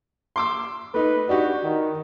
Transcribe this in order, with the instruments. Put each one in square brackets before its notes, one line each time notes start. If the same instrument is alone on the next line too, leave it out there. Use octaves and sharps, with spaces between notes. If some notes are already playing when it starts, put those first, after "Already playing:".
[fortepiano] C6 D6 E6
[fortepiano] A3 D#4 [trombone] B4
[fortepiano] D4 D#4 G4 [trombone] F#4
[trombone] D#3